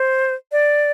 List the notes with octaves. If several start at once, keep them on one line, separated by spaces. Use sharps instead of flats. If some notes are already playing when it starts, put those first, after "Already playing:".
Already playing: C5
D5